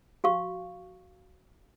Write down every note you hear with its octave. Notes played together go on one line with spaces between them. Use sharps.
F#4 F5 C#6